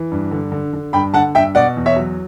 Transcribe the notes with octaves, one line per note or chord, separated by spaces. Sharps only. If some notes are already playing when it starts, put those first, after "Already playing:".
Already playing: E3
G2
D3
D3
D3
G2 G5 B5
D3 F#5 A5
G2 E5 G5
B2 D5 F#5
E2
C#5 E5
F#3